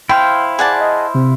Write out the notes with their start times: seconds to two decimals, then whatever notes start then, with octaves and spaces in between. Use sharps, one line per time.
0.09 E4 C5 F5 G5
0.59 G#4 D5 F#5 A5
0.81 D#5
1.15 C3